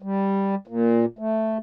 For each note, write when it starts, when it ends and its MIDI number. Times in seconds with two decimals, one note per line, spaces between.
0.02 0.55 55
0.67 1.05 46
1.19 1.58 57